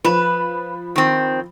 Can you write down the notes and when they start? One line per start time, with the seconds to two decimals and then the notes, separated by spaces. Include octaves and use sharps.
0.04 F3 B4 B5 E7
0.96 D#3 C4